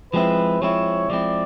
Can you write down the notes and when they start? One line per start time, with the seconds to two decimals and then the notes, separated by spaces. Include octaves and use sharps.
0.13 F3 G#3 C4 E4 B4
0.61 F3 G#3 C4 E4 C#5
1.10 F3 G#3 C4 E4 D5